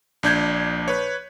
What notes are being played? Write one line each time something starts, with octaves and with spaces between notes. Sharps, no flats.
A#1 D4 G6 G#6
B4 C#5